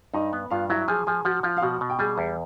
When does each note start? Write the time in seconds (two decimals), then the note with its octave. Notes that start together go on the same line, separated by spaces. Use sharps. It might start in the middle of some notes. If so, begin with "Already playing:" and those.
0.14 G2 D#4 D#5
0.33 B3
0.51 G2 F4 F5
0.69 F#3 E4 E5
0.88 F3 G#4 G#5
1.07 F3 G#4 G#5
1.25 F3 F#4 F#5
1.43 F3 F4 F5
1.57 F5
1.62 B2 F#4 F#5
1.81 B2
1.90 G5
1.99 G3 G#4 G#5
2.18 E2